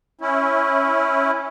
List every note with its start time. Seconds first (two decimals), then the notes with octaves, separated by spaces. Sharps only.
0.21 C#4 E4